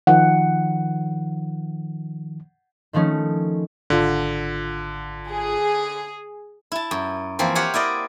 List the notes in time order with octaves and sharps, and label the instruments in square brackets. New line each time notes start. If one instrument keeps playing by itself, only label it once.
[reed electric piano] D#3 F3 [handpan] F#5
[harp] D#3 F3 A3 C#4 D#4
[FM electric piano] G#1 F4 [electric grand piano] D3
[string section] G#4
[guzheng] E4 A5
F#2
E3 F3 A#3 C4
G4 C5 C#5 F5 F#5 G#5
E4 A#4 D5 D#5